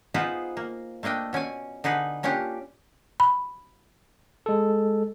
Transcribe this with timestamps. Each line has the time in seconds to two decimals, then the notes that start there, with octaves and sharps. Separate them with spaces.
0.14 B3 D#4 F4 G#4 B4 C5
0.57 A#3
1.03 A3 A#3 D4 D#5 G5
1.33 B2 C#4 D5 G#5
1.84 D3 D#4 G#4 B4
2.23 A#3 C#4 D4 F4 G4
3.20 B5
4.46 G#3 A4